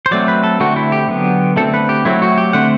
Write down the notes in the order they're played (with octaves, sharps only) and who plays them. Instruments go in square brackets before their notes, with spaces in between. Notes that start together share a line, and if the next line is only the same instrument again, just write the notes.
[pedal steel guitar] C5
F#3 A3 C4 D5
B4
A4
D3 A3 C4 F#4
E4
G4
D3 F#3 B3
D3 A3 C4 A4
B4
G4
F#3 A3 C4 E4
F#4
G4
D3 A3 C4 F#5